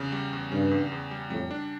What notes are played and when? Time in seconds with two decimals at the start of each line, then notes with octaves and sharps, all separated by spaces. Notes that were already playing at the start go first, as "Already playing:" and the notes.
Already playing: E2 C#3
0.12 G3
0.33 E2
0.52 G2 C#3
0.71 E2
0.92 E2
1.11 G3
1.30 F2 A2 G3
1.51 D4